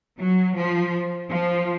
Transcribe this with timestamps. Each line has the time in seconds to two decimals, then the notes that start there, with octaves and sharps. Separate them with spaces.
0.17 F#3
0.55 F3
1.30 F3